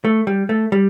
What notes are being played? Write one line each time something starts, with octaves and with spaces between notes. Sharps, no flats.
A3
G3
A3
G3